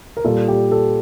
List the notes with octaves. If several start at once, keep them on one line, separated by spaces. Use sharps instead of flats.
A#4
A#2 G3 A4
G4
A4